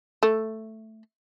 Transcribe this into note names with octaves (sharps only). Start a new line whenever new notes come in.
A3